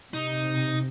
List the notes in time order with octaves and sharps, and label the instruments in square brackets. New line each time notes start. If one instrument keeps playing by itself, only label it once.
[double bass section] C3 [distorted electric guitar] D#4